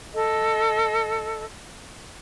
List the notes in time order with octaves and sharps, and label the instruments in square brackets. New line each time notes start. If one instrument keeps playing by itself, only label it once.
[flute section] A4 D#5